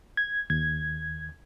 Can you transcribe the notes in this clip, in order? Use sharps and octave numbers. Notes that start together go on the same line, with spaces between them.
G#6
D#2 G#6